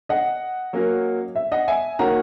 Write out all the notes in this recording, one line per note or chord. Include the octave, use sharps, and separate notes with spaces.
D#5 F#5
F#3 A#3 C#4 F#4 A#4
E5
D#5 F#5
E5 G#5
D#3 A#3 C#4 F#4 F#5 A#5